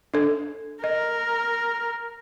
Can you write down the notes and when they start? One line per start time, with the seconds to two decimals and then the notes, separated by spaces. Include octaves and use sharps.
0.14 D4 A4
0.84 A#4 D#5